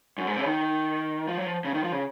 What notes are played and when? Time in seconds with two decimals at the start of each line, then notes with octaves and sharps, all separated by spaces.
0.18 F#2
0.27 G#2
0.36 C3
0.41 C#3
0.46 D#3
1.28 F3
1.37 F#3
1.46 F3
1.65 C#3
1.74 D#3
1.84 F3
1.92 C#3